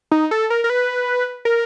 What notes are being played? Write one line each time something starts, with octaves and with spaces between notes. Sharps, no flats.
D#4
A4
A#4
A#4
B4
A#4